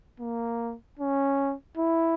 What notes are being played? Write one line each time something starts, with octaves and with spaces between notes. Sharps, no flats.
A#3
C#4
E4